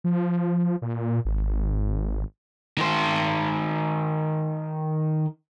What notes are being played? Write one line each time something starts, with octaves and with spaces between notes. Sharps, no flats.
F3
A#2
G#1
D#3 C5